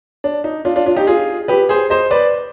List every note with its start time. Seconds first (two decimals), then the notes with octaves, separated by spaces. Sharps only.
0.24 D4
0.44 D#4
0.65 D4 F4
0.76 D4 F4
0.86 D4 F4
0.96 D#4 G4
1.07 F4 G#4
1.48 G4 B4
1.69 G#4 C5
1.90 C5 D#5
2.11 B4 D5